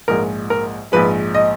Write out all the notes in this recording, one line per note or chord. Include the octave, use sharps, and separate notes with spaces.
A#1 G#2 F3 G#3 A#4
A#4
A#1 G#2 F3 G#3 B4
D#5